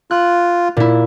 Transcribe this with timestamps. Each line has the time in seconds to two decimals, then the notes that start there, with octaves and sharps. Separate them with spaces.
0.11 F4 F#6
0.77 A#2 E4